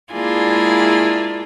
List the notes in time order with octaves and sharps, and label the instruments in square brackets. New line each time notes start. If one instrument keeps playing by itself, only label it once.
[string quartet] G#3 A#3 D4 E4 F4 G#4